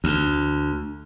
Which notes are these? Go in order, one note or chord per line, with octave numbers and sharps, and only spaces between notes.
D2